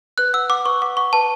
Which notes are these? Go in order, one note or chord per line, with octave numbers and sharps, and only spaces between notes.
B4 F#6
F#5 E6
F#5 D6
B4 C#6
F#5 D6
F#5 C#6
B4 A5